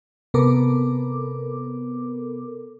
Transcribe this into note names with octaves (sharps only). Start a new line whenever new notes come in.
C3 B3 A4 A#4 D6